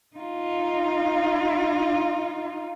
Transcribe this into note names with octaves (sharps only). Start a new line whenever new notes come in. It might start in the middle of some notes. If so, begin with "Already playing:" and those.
D#4 F4